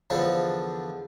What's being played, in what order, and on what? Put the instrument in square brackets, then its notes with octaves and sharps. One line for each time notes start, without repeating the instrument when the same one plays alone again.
[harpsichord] E2 D3 F3 D4